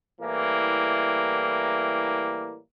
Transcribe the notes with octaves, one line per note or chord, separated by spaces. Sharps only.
A2 E3 G3 A#3